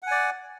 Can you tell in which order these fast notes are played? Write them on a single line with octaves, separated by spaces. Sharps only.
F#5 G#5 D5